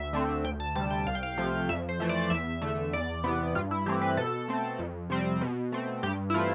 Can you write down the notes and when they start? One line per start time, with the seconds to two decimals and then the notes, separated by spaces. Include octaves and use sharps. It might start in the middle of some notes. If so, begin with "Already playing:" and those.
Already playing: D2 E5
0.13 D3 A3 C4
0.44 D2 G5
0.60 A5
0.75 C3 G3 A5
0.90 G5
1.06 C2 F5
1.15 G5
1.23 F5
1.38 C3 F3 A3
1.69 F2 E5
1.89 C5
2.00 E3 A3
2.09 D5
2.30 E2 E5
2.62 D3 A3
2.93 E2 D5
3.24 C3 E3 B3
3.55 G2 F4
3.71 E4
3.86 E3 A3 C4 G4
4.02 B4
4.17 B2 A4
4.48 A3 C4
4.79 F2
5.10 C3 G3 C4
5.41 B2
5.72 A3 C4
6.03 G2 G4
6.30 E4
6.34 E3 A3 C4 F4